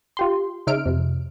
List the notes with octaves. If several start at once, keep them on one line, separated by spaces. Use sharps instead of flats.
F4 G4 C6
C#3 D#4 E5 F6 D7
F2 C3